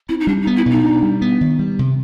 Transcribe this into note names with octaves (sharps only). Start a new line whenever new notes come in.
C4 E4
D#4
G3 D4
D#4
B3
E4
B2 D#4
D4
G3
B3
D#3
G3
C3